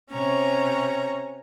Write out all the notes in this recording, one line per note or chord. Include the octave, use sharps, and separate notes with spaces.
C3 C#4 C#5 A#5